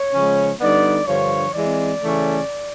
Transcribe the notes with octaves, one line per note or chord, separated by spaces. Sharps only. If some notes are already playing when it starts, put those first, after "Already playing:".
Already playing: C#5
C#3 F3 G#3 C#4
D3 G3 B3 D#4 D5
G2 D3 F3 C#5
E3 G#3 C4 D5
C#3 E3 A3 C#4